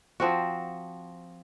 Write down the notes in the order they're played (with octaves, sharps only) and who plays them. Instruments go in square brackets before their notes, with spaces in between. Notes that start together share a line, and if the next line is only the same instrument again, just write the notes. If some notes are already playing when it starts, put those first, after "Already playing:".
[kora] F3 C4 F#4